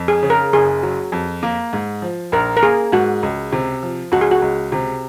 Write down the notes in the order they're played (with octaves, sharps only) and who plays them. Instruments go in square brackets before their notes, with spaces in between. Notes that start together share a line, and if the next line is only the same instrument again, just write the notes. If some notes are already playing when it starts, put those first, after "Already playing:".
Already playing: [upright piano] F2
[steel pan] G#4
[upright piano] C#3
[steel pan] A#4
[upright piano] F#1 [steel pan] G#4
[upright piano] F#3
F2
A#3
G#2
F3
[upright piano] A#1 [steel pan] A#4
[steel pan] A#4
[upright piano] A#3 [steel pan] G#4
[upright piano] G#2 [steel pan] F#4
[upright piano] C#2
C3
F3
[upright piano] C#2 [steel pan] F#4
[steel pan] G#4
F#4
[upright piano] C#2
C3